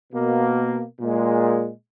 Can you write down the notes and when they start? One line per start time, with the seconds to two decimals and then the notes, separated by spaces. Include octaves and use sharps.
0.13 B2 A#3
1.00 A#2 G#3